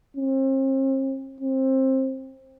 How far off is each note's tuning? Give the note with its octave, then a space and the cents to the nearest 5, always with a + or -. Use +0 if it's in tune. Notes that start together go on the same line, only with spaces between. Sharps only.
C4 +40
C4 +20